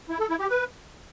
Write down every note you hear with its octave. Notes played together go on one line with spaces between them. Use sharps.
E4
A4
E4
G4
B4